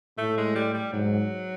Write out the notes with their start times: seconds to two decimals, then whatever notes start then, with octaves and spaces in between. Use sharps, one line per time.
0.18 A2 A3
0.37 G#3
0.55 G3
0.74 G3
0.93 G#2 F#3